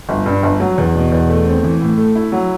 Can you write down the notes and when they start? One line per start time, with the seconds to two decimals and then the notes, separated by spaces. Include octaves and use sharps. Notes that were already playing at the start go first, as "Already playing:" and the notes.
0.09 G1
0.26 G2
0.43 G1
0.60 F#3
0.78 E2
0.94 B2
1.12 E2
1.29 A3
1.46 C4
1.63 E3
1.81 A2
1.97 A3
2.15 E4
2.32 F#3